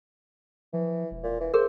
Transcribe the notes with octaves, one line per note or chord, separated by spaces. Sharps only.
E3 F3
E1
A#2
E3
G#4 A#4 C5